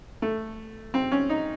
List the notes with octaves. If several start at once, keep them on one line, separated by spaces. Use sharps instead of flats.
A3
C4
C#4
D#4